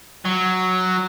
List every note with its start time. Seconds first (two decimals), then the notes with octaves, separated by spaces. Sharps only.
0.25 F#3